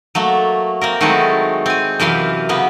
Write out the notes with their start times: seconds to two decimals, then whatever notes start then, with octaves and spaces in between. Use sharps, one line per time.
0.15 F#3 A3 A#3
0.81 A#3 C4 A#4
1.01 D#3 F#3 G#3 A3 C4 E4
1.66 C4 G#5
1.99 F#2 C3 E3 F5 C6
2.49 C#3 A#3 B3